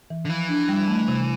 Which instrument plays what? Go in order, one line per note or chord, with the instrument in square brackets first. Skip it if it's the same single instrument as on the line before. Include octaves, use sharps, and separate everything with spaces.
[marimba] E3
[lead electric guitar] D3
[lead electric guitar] E3 [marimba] F3
[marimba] D4
G3
A3
C3